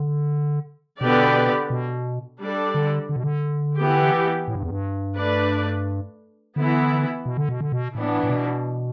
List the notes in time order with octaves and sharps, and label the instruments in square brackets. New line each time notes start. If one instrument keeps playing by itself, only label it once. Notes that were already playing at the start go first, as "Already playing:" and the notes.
Already playing: [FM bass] D3
[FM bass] B2 [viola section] D3 B3 G4 B4 D5
[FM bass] B2
[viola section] G3 D4 A4 D5
[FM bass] D3
D3
B2
D3
[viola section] E3 B3 G4
[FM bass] A2
G2
E2
G2
[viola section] A3 D4 B4 D5
[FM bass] D3 [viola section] E3 B3 E4
[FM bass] B2
D3
B2
D3
B2
[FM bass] A2 [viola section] E3 B3 D4
[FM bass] A2
B2